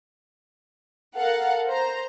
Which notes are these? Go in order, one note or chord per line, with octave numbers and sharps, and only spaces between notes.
A4 A#4 F5 F#5
C5 A#5